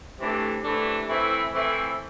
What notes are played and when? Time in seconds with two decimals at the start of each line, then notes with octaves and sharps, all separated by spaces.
0.19 C3 E3 A3 D4
0.64 C3 E3 A3 D4
1.08 E3 A3 C4 E4
1.54 E3 A3 C4 E4